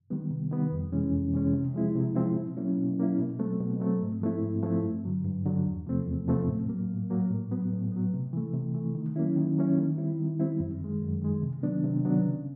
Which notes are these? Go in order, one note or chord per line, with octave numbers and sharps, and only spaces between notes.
D#3 G3 B3
C3
D#3 G3 B3
F2
C3 E3 G#3 C#4
F2
C3 E3 G#3 C#4
C3
F3 G#3 C4 E4
C3
F3 G#3 C4 E4
B2
F#3 A#3 C#4 E4
B2
F#3 A#3 C#4 E4
B2
F#3 A3 C4
B2
F#3 A3 C4
G#2
F3 A3 C4 E4
G#2
F3 A3 C4 E4
G2
D3 F#3
G2
D3 F#3
E2
C3 F3 A3 C4
E2
C3 F3 A3 C4
A2
F#3 A#3
A2
F#3 A#3
A2
F#3 B3
A2
F#3 B3
C3
E3 A3
C3
E3 A3
D#3
F#3 A#3 C#4 E4
D#3
F#3 A#3 C#4 E4
D#3
G3 C4 E4
D#3
G3 C4 E4
F#2
D#3 G#3
F#2
D#3 G#3
C3
D#3 F#3 B3 D4
C3
D#3 F#3 B3 D4
C#3